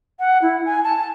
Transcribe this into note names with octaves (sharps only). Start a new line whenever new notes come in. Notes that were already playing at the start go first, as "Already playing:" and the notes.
F#5
E4
G#5
A5